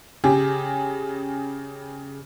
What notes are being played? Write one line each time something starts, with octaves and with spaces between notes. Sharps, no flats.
C#3 G4 G#4